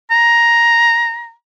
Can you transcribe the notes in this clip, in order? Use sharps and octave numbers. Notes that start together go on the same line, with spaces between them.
A#5